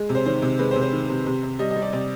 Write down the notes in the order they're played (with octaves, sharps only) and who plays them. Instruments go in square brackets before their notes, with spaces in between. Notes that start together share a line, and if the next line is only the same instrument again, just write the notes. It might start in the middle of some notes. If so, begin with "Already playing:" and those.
Already playing: [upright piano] G#3
C3
C5
D#3 C5
C3
G#3 B4
C5
C3
C5
D#3
C3
C3
C3
G3 D#5
D#5
G3
D5
C3 D5